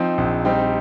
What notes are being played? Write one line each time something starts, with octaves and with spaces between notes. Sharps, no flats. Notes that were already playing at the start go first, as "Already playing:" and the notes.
Already playing: F3 C4 D#4
A#1
G3 C4 D#4